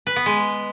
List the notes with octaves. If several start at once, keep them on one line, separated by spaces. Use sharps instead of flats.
B4
B3
G#3